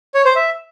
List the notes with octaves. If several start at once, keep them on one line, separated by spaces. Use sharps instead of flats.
C#5
C5
E5